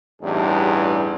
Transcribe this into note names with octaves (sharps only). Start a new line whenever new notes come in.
A1 E2 G2 D#4 G#4